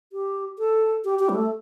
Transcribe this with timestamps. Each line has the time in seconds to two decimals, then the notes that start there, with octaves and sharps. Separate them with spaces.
0.13 G4
0.59 A4
1.04 G4
1.19 G4
1.29 G3
1.35 A3